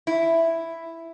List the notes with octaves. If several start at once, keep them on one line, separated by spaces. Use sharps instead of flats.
E4